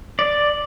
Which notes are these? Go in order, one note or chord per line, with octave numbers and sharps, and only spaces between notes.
D5